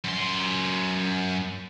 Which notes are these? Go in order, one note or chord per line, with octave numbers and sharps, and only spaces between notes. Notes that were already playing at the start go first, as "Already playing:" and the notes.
F#2 C6